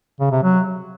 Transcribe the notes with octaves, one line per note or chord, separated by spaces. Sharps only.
C#3
C3
F#3